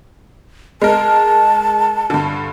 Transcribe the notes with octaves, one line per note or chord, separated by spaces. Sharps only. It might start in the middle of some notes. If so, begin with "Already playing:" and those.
G#3 A#4 A5
G2 D3